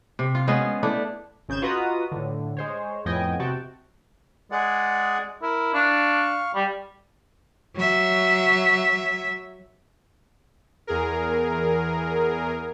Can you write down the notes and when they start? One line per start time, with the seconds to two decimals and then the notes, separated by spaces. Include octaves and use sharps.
0.19 C3
0.35 F4
0.48 G#3 B3 C#4 F4
0.83 A3 D4 E4
1.49 G#1 C#3 G6 G#6 E7
1.62 F4 F#4 B4 D#5 A#5 D#6
2.12 A2 D3
2.57 G#3 C5 C#5
3.05 F2 A2 B3 D#5 G5 G#5
3.39 C3 F#4 G5 A5
4.52 G#3 G#4 D5 F#5
5.42 E4 A#4
5.74 D4 F5 C#6
6.55 G3
7.76 F#3 E5
10.87 E2 G#4 A#4